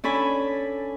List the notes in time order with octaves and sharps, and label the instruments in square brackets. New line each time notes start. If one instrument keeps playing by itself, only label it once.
[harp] C#4 D4 A4 G#5 B5